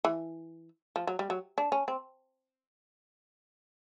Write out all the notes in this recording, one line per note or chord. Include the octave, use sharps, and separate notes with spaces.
E3
F3
F#3
G3
F#3
D4
C#4
C4